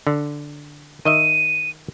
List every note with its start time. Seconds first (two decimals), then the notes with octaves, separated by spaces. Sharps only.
0.07 D3
1.05 D#3 D#5 E5 D#7